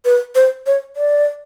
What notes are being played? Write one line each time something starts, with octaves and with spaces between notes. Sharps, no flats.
B4
C5
C#5
D5